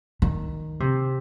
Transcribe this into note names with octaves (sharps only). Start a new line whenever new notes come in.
D#3
C3